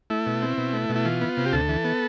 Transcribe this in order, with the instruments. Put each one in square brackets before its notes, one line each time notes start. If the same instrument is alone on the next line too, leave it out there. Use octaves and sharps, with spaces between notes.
[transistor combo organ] A3 E4
B2
C4
B2
A3
B2
E4
E3 F4
B3
C3
G4
D2 A4
E3
B3